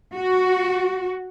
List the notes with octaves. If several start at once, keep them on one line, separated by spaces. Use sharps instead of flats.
F#4